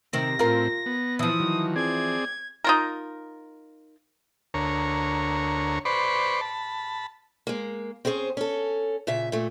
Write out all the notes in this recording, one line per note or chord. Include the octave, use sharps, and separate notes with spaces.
C3 D#3 C4 A#6
A2 C4 F4 A#4
B3
E3 F3 D#6
D#3 F#3
C4 G#4 D5 G#6
D#4 F4 A#4
D2 A#4 C#5
B4 C5 D5 B5 C#6
A5 B5
G#3 A#3
C4 C#4 G#4 B4 C5
C#4 A4
A#2 C#3 E5
A#2 A3